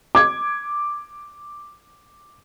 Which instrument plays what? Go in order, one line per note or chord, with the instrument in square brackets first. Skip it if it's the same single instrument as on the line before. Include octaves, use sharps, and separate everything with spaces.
[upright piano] D6 G#6